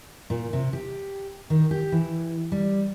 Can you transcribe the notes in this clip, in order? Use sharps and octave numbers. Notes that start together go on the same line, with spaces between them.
A#2
C3
G4
D#3
G4
E3
G3